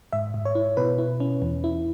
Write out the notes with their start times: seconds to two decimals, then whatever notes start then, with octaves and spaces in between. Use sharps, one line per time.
0.13 G#2 E5
0.34 G#2
0.45 C#5
0.55 E4
0.77 B2 B4
0.98 E4
1.20 C#4
1.42 E2
1.64 E4